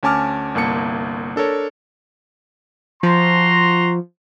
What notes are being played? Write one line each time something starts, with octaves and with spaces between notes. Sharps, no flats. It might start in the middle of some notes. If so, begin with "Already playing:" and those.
D2 C#4 G#5 A5 D6 F6
G1 C2 A#3 A5 C#7
D4 A4 A#4 C#5
F3 F#4 A#5 C6